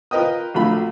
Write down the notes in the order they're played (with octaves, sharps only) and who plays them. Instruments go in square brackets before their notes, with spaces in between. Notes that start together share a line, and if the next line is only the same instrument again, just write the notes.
[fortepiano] F4 A#4 B4 D#5 G5 D#6
A#1 F#3 A3 F4 B5